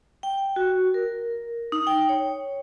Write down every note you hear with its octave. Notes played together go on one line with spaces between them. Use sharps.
G5
F#4
A#4
D#4
G5
C#5